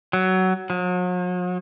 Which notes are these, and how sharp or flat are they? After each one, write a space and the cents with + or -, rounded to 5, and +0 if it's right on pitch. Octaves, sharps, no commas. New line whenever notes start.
F#3 +15
F#3 -45